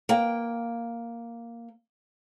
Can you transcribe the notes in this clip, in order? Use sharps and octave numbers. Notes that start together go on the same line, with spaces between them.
A#3 G5